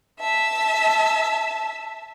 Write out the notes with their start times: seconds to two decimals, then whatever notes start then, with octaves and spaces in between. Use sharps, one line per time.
0.18 E5 A5